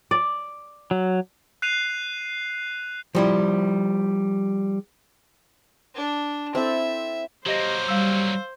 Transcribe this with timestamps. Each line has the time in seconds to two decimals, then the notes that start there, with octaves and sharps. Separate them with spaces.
0.11 D5
0.91 F#3
1.62 F#6 C7 D#7 F7
3.15 F3 G3 E4
5.95 D4
6.55 C4 E4 A4 E5
7.46 F#3 A#3 G4 C5 D#5 A#6
7.88 G3 F5 E6